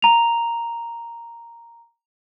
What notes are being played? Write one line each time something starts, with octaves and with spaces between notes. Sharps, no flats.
A#5 F7